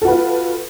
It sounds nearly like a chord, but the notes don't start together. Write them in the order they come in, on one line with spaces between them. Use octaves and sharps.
A4 F#4 B4 F4